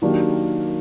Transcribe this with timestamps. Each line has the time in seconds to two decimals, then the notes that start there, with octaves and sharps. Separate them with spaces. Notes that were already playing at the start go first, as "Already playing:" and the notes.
0.02 D#3 F#3 A#3 D4 G4